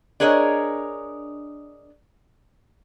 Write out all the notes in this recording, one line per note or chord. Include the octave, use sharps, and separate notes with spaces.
D4 G#4 A#4 C#5 D#5